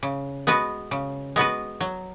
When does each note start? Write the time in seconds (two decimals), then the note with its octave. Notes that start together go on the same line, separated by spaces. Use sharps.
0.03 C#3
0.47 G#3 B3 F#4 B4
0.91 C#3
1.36 G#3 B3 F#4 B4
1.80 F#3